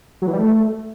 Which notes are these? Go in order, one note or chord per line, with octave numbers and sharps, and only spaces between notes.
F#3
E3
G3
A3